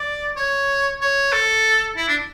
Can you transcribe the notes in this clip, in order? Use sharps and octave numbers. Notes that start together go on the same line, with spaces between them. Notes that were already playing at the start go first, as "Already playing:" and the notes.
Already playing: D5
C#5
C#5
A4
E4
D4